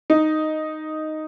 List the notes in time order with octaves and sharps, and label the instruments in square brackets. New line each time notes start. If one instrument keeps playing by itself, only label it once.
[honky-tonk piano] D#4